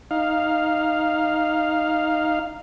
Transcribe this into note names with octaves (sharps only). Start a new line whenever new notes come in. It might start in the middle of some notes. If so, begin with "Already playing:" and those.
D#4 F5